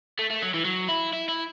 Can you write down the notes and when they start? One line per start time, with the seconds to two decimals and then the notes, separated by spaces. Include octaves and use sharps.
0.19 A3
0.30 A3
0.42 F#3
0.54 E3
0.65 F#3
0.89 E4
1.13 E4
1.29 E4